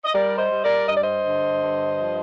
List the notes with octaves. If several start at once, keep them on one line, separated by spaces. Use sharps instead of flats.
D#5
G3 A#4 D5
C5 D#5
G3
A#4 D5
G2 D#5
D5
C5 D#5
D3
G2
F3